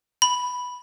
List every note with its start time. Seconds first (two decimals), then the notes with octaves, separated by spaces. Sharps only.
0.22 B5